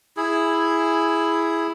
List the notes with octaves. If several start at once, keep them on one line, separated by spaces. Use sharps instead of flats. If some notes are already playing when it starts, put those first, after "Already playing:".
E4 G#4